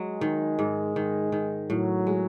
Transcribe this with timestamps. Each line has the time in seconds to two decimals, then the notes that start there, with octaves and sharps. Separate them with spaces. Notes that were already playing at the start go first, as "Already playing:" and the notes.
Already playing: F#3 G#3
0.21 D#3
0.59 G#2
0.96 D#3
1.32 D#3
1.69 A2 F#3
2.07 G#3